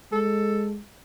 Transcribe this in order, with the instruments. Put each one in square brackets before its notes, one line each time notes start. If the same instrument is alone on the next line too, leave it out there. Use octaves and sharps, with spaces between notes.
[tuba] G#3 [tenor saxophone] A4